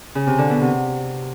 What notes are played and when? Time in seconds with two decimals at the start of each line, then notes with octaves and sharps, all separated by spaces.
0.15 C#3
0.27 C3
0.38 D3
0.50 B2
0.61 C3